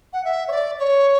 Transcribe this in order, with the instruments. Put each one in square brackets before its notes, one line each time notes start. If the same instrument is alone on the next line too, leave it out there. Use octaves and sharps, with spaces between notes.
[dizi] F#5
E5
C#5
D5
C#5